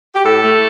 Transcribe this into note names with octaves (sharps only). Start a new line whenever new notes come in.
G4
A2 A4
A3